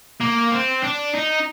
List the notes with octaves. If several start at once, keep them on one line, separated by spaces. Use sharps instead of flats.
A#3
C4
D4
D#4